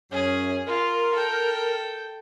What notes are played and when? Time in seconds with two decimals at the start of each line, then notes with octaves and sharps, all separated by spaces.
0.12 F#2 C#4 G#4
0.67 F4 A#4
1.14 A4 G5